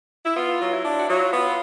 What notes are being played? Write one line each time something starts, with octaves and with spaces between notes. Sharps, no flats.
E4
B3 F4
F#3
E4
D4
F#4
F#3 F4
B3